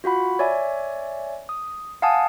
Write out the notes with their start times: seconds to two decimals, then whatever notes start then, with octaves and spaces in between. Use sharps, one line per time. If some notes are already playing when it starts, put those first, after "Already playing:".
0.04 F4 F#4 F#5 B5
0.39 C#5 D5 E5 G#5
1.49 D#6
2.02 F5 F#5 G#5 A5 D#6